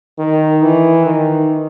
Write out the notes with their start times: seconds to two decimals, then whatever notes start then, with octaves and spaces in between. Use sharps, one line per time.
0.19 D#3
0.62 E3
1.05 D#3